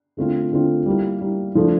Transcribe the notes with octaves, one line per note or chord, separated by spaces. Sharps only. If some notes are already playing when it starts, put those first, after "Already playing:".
D3 A3 C4 F4
D3 A3 C4 F4
G3 A#3 E4
G3 A#3 E4
F3 A3 D4 A4